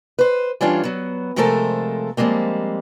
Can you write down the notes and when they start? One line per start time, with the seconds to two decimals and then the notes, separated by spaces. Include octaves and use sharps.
0.19 B4 C5
0.61 E3 G3 C#4 D4 F4
0.83 F#3 B3
1.36 C3 F3 G#3 A3 A4 A#4
2.17 F3 G3 G#3 A#3 C4